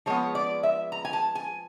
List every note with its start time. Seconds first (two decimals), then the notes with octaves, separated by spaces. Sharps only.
0.06 F3 G#3 B3 C#5
0.35 D5
0.63 E5
0.92 A#5
1.05 G#5
1.13 A5
1.35 G#5